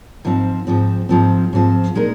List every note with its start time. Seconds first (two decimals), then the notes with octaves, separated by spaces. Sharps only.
0.25 G#2 F3 C4
0.67 G#2 F3 C4
1.09 G#2 F3 C4
1.53 G#2 F3 C4
1.95 A#2 G#3 D#4 A#4